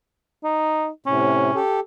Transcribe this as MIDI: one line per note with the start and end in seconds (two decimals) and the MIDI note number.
0.44 0.88 63
1.06 1.51 45
1.06 1.51 48
1.06 1.58 61
1.54 1.80 67
1.54 1.80 69